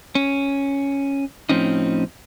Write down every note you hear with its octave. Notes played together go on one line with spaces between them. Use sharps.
C#4
A2 F3 C4 C#4 D#4